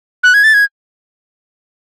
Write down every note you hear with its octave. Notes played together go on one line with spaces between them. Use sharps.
F#6
G#6
A6
G#6